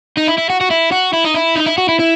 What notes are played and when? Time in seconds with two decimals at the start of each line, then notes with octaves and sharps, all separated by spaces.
0.18 D#4
0.28 E4
0.38 E4
0.50 F#4
0.61 F#4
0.70 E4
0.92 F#4
1.13 E4
1.24 D#4
1.34 E4
1.56 D#4
1.66 E4
1.78 F#4
1.89 E4
1.99 E4